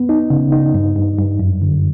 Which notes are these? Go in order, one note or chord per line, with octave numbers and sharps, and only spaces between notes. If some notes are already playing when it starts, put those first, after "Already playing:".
Already playing: B3
D#4
C#3
D#4
G2
G2
G2
F#2
D3